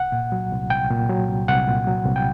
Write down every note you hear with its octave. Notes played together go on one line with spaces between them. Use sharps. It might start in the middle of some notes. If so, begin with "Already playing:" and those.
Already playing: C2 F#5
A#2
F#3
C2
C2 G5
A#2
F#3
C2
C2 F#5
A#2
F#3
C2
G5